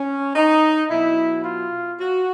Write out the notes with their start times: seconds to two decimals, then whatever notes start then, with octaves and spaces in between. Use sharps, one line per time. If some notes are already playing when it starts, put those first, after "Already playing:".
Already playing: C#4
0.35 D#4
0.90 B2 F#3 E4
1.44 F4
2.00 F#4